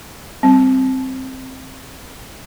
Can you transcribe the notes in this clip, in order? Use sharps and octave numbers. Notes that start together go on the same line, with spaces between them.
G3 C4